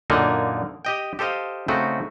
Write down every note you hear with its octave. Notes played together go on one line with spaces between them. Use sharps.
F#2 A#2 D3 A#3 D#4 F4
G4 D#5 G5
G4 A4 C5 D#5 F5
C#3 A3 C4 D#4 F#4